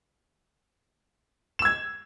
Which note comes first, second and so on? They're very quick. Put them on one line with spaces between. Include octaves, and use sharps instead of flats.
E7 E6 G#6